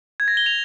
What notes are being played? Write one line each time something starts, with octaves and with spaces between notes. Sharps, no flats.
G#6
A#6
G7
F7